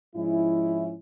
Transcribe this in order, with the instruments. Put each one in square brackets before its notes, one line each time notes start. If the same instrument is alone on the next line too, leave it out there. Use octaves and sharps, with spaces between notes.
[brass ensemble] G#2 F3 G#3 C#4 E4